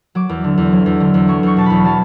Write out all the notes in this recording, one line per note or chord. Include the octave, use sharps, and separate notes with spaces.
F#3 D6
E2
D3
E2
F#3
E2
D3
E2
F#3 C#6
E2 C#6
B2 A5
E2 B5
F#3 A5